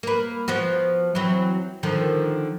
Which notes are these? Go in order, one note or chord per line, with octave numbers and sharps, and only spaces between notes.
A#3 B4
F3 B3 F#4
E3 F#3 C4
D3 D#3 F3